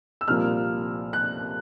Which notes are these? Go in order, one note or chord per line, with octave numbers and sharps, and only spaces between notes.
E6
C2 A#2 F3 A#3 F6
F#6